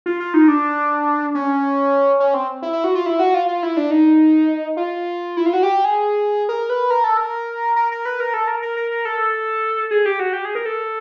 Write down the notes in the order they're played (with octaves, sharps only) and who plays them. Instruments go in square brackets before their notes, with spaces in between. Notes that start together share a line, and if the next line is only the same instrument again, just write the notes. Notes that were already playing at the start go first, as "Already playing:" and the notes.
[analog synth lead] F4
F4
D#4
D4
C#4
C#4
C4
E4
E4
F#4
F4
E4
F#4
F4
F4
E4
D4
D#4
F4
E4
F4
F#4
G4
G#4
A#4
B4
A#4
A4
A#4
A#4
A#4
B4
A#4
A4
A#4
A#4
A#4
A#4
A4
G#4
G4
F#4
G4
G#4
A#4
A4